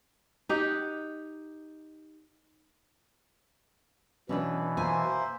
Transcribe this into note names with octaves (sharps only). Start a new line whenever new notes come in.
D#4 G4 F#5
B2 E3 C#4 D4 B4
A#3 C5 E5 G#5